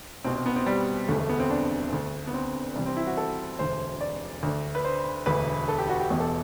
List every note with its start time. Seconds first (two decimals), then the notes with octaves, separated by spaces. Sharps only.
0.24 C2 B2 C4
0.36 C4
0.46 B3
0.56 C4
0.66 G3
1.08 E1 D2 D3 A3
1.19 A3
1.29 B3
1.40 C4
1.50 D4
1.92 D2 D3
2.27 B3
2.33 C4
2.76 C2 C3 E3 G3
2.86 C4
2.97 E4
3.07 F#4
3.17 A4
3.59 E1 D2 D3 C5
4.01 D5
4.43 D2 D3
4.75 B4
4.85 C5
5.26 E1 D2 D3 B4
5.68 A4
5.79 G4
5.89 F#4
6.00 G4
6.10 E1 E2 B2 G4
6.20 A4